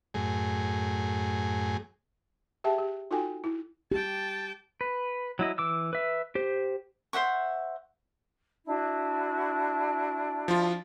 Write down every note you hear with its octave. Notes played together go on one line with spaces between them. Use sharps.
F#2 A2 G#4
G4 G#4 E5 G5 A5
G4
D#4 F4 F#4 A4 G5 G#5
E4
G4 G5 A5
B4
F#3 E4 D#5
E3 D6 E6
B4 E5
G4 C5
C5 E5 F#5 C#6
D4 E4 F#4
F3 F4